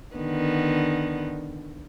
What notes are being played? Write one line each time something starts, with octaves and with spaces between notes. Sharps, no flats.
D3 D#3 B3